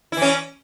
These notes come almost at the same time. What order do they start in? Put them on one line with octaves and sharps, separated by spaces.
E4 E3 C#4